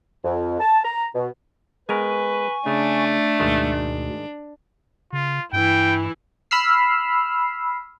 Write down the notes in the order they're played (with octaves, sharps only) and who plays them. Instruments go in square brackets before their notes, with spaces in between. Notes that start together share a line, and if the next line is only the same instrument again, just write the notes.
[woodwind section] F2
A5
A#5
B2
[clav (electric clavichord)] G#3 B3 A#4 [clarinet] B4 [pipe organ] G#5 C#6
[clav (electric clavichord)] C#3 [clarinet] A3 [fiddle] D4
[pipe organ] D2 B2 [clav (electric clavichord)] G#2 D#3
[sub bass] C#3 [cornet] F4
[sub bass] G2 [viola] E3 E4 [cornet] G5
[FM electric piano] B5 E6 F6 C7